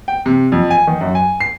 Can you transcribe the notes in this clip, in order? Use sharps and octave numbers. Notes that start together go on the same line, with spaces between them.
G5
C3
F2
G#5
D#3
F#2
G#5
C7